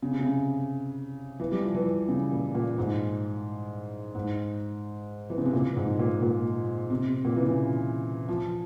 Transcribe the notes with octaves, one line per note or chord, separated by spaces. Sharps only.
C#3
C3
C#3
E3
G3
F3
E3
C#3
A#2
A#2
G#2
G#2
E3
C#3
C3
A#2
G#2
A#2
A#2
C3
C3
A#2
E3
C#3
F3